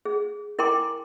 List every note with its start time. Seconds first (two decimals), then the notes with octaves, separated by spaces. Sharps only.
0.05 G#4
0.59 E4 A#4 G5 G#5 C6 D6